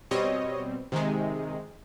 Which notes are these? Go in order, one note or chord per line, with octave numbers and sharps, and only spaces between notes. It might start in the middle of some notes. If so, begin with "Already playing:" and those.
B2 G3 C4 C#5 D#5
C3 D#3 G#3